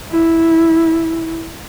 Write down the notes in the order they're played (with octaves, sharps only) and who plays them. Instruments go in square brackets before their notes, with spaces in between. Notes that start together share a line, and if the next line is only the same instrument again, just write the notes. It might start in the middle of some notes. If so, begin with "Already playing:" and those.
[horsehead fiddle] E4